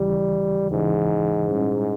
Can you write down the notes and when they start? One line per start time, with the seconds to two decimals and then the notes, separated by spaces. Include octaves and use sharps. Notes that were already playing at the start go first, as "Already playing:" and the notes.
Already playing: D#2 C#3 E3 G3
0.71 D#2 G#2 C#3 E3
1.48 A#2 G3 C#4 E4